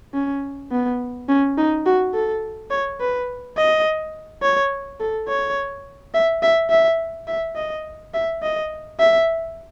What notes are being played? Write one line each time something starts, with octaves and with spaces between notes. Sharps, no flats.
C#4
B3
C#4
D#4
F#4
A4
C#5
B4
D#5
C#5
A4
C#5
E5
E5
E5
E5
D#5
E5
D#5
E5